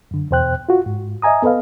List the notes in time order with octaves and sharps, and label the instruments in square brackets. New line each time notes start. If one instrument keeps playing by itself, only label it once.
[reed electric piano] F#2 D3
E2 B2 C5 G5 F#6
F4 F#4
G#2
D#5 E5 G#5 A#5 D#6
B3 A4 B4 D#5 F5